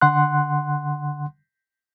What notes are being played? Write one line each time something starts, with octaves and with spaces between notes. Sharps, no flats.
D3 F#5 C6 F#6